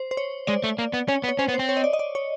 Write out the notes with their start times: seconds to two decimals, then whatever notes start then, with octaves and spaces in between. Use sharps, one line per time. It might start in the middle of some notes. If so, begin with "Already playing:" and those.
Already playing: C5
0.11 C5
0.17 C#5
0.47 G#3 D5
0.64 A3
0.79 A#3
0.93 B3
1.08 C#4 C#5
1.24 B3
1.29 C#5
1.39 C#4 C5
1.48 B3
1.54 C5
1.59 C4
1.69 C#5
1.77 D#5
1.84 D5
1.93 D#5
1.99 D5
2.15 C#5